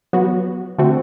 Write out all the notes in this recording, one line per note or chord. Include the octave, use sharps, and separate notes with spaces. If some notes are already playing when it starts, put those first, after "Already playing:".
F#3 B3 F#4
D3 A3 C4 F#4